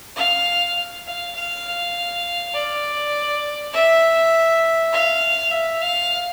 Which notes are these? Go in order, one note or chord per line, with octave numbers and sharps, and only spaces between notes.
F5
F5
F5
D5
E5
F5
E5
F5